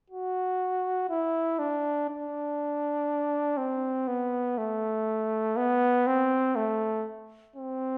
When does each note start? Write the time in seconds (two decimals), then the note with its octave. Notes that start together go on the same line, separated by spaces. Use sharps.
0.10 F#4
1.10 E4
1.59 D4
2.10 D4
3.58 C4
4.08 B3
4.58 A3
5.57 B3
6.07 C4
6.56 A3
7.56 C4